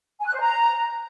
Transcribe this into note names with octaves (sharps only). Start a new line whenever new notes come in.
G#5
F#6
C5
A#5